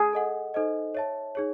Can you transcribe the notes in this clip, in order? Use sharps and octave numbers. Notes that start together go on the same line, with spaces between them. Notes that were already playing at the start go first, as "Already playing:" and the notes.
Already playing: G#4
A4 D#5 F#5
D#4 A4 C5 D#5
C#5 E5 A5
D#4 G#4 C#5